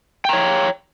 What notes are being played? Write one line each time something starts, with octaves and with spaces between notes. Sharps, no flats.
C#5 G5 A#5